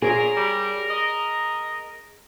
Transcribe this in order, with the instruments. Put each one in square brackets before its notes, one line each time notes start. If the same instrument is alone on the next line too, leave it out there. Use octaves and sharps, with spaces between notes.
[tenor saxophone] A#2 [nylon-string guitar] G#4 C#5 [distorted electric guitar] A#4
[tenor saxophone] G3
D#5